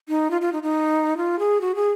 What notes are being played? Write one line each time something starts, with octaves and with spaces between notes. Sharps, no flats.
D#4
F4
F4
D#4
D#4
F4
G#4
F#4
G#4